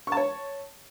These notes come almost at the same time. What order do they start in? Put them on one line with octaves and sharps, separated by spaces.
C#6 A5 C#5